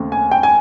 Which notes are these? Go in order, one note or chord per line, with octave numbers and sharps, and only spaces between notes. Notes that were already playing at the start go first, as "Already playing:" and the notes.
Already playing: D#2 C#3 A3 C4
G#5
G5
G#5